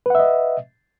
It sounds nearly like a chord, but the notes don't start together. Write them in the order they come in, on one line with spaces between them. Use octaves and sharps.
B4 F#5 E5 D#5